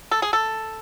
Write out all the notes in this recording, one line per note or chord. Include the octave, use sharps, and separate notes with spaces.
A4
G#4
A4